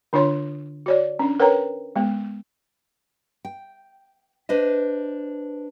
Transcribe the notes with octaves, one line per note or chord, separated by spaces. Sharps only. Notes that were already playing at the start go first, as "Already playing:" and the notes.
D3 D4 F4 C#5 C6
F#4 C#5 D5
C#4 D4
A#4 B4 C#5 G5 A#5
G#3 B3
G5
D4 B4 C5 D#5